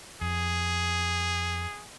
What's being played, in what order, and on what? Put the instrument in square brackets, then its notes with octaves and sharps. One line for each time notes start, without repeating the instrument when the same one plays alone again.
[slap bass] F2 [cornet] G#4